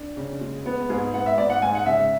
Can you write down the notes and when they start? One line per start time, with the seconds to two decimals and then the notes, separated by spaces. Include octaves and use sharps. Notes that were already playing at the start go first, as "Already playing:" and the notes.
Already playing: D4
0.17 C#3
0.41 G#3
0.66 B3
0.89 G#2 G#4
1.14 B3 F#5
1.26 E5
1.37 G#2 D5
1.50 F#5
1.62 G#2 G#5
1.75 F#5
1.86 C#3 E5